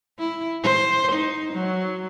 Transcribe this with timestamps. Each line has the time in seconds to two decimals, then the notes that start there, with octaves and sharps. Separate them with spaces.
0.19 E4
0.63 C5
1.12 D#4
1.53 F#3